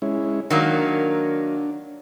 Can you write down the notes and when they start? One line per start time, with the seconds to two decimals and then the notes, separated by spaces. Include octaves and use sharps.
0.02 G#3 C#4 E4
0.50 D#3 F#3 A#3 D4